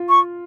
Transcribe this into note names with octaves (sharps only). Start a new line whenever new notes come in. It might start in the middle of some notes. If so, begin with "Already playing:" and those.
Already playing: F4
C#6